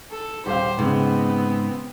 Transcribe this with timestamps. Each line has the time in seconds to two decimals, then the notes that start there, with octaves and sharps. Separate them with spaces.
0.11 A4
0.46 D#1 G4 C5 F5
0.79 G#2 C#3 B3 C4